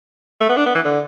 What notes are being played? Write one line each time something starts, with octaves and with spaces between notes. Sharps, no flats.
A3
B3
D4
B3
E3
D3